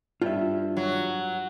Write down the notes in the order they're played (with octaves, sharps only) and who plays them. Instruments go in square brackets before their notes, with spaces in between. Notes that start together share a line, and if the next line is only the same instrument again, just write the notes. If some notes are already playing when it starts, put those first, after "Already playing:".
[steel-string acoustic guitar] G2 [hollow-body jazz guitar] F4 E5
[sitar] F#3